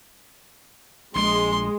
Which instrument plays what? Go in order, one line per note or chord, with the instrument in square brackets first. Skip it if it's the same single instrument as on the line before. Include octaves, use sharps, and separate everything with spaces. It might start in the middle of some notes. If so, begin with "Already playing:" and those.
[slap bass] A#1 A#2 [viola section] G#3 [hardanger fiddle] C6